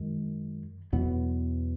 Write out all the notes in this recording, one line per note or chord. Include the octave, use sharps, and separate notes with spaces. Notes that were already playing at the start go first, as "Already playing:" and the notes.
Already playing: F#2 D#3 G#3
E2 B2 F#3 B3